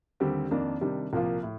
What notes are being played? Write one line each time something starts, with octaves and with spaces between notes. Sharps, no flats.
D#2 D3 G3 C4 G4
F2 D#3 A#3 D4
C3 D#3 G3 D4
C2 A#2 F3 A#3 F4
A2